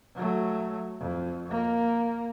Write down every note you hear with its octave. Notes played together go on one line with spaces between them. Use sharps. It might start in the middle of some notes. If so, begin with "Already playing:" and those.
F#3 A3
F2
A#3